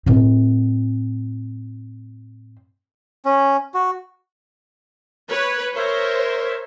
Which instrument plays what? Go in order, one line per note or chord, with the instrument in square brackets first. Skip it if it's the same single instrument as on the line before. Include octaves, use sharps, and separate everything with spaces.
[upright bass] A2 C4
[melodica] C#4
F#4
[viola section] B4 C#5
[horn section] A#4 E5 [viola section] C5 C#5